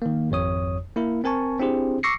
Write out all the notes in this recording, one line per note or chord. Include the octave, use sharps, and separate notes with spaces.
D#3 A#3
G#1 F2 C#5 D#6
A#3 E4 A#4
C4 A#4 G#5 A5 C#6
C4 D4 E4 G4 G#4 C5
C#6 D6 E6 A#6 C7 C#7